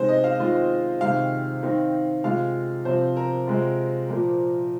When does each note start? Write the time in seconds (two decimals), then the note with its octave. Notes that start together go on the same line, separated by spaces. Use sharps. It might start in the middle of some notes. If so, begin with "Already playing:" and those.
Already playing: C3 G#3 C4 D#4 C5
0.09 D#5
0.24 F5
0.39 D#3 G#3 C4 F4
1.01 C3 D#3 G#3 F5
1.63 D#3 C4 D#4
2.24 C3 G#3 F4 F5
2.85 C3 F3 C4 C5
3.16 A#4
3.47 C3 G#3 C4 F4
4.09 A#2 F3 A#3